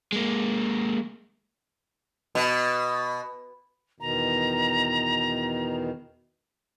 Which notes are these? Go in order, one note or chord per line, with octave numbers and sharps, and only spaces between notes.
G#3 A#3
B2
E2 B2 D#3 A#5